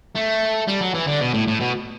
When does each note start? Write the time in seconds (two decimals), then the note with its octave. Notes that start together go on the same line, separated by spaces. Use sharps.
0.15 A3
0.68 G3
0.81 F#3
0.94 E3
1.07 D3
1.21 B2
1.34 A2
1.48 A2
1.60 B2